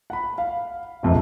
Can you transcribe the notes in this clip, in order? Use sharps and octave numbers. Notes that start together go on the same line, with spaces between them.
F#5 B5
F5
E1 A#1 F2 C3